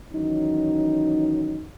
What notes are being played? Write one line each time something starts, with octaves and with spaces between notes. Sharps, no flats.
D#3 E3 F#3 C#4 D#4